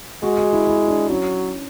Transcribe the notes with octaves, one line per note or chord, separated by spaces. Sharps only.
G#3 F#4
F#4
E4
E4
D4
F#3 C#4